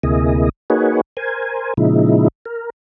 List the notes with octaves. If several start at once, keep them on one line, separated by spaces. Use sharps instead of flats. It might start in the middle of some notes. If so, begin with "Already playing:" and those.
D2 C3 A#3 E4 G#4 D#5
A#3 D#4 F#4 G#4 B4 C#5
A#4 C5 G#5
A#2 C#3 F3 G#3 D#4 E4
A#4